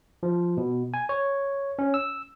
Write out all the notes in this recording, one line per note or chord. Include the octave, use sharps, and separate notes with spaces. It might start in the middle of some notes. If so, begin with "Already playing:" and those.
F3
B2
G#5
C#5
C#4
E6